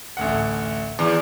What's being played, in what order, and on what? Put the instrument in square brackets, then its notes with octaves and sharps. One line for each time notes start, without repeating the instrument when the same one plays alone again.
[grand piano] A1 D2 F#5
[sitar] E2